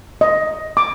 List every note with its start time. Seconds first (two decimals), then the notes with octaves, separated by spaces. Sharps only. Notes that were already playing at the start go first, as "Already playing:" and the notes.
0.21 D#5
0.77 D6